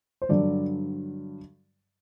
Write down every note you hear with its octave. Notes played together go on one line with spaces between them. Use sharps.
C5
G2 D3 F#3 D5